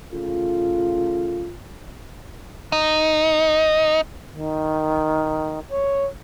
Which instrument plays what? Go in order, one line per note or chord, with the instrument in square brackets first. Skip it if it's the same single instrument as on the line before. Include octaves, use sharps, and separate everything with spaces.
[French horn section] C#3 A3 F4
[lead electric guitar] D#4
[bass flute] D#3
C#5